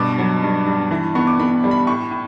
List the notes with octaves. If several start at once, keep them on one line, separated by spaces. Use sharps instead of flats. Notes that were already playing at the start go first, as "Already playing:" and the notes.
Already playing: G2 B2 D6
F#3
G2
G2
E3
B3 C#6
D6
B3 B5
G3
B5
A2 C#6
A2